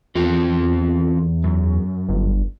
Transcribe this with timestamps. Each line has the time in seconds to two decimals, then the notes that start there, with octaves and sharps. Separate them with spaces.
0.15 E2 C4 F4 A4
1.44 F#2
2.09 G1